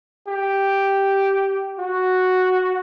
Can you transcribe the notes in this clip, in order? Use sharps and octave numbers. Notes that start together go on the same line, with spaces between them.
G4
F#4